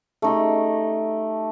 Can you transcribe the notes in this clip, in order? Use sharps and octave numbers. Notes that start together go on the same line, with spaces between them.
A3 D#4 G4